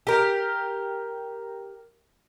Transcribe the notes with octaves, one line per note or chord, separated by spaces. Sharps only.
G4 A#4